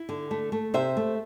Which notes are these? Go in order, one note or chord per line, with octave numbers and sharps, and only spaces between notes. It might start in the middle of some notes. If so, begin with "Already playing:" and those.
Already playing: E4
D3
A3
A3
C3 C5 E5
A3